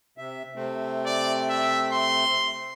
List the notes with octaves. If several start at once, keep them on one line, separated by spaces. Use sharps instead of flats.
C3 E5
C3 A3 C4
D5
E5
C6